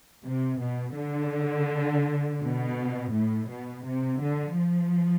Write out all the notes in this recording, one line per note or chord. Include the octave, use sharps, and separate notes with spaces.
C3
B2
D3
B2
A2
B2
C3
D3
F3